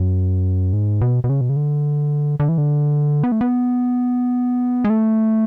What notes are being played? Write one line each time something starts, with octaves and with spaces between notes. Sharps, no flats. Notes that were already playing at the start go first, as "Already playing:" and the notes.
Already playing: F#2
G#2
B2
B2
C#3
B2
C#3
D3
D3
E3
D3
B3
A3
B3
G#3
A3